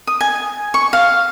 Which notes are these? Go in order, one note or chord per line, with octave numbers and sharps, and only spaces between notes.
D#6
G#5
C#6
F5